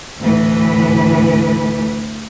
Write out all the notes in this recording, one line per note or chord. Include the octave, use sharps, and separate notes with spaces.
D2 A2 E3 B4